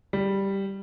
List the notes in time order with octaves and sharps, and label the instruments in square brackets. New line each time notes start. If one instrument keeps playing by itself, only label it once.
[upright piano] G3